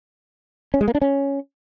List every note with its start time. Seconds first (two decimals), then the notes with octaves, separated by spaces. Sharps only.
0.74 C#4
0.81 G#3
0.88 A#3
0.95 D4
1.02 C#4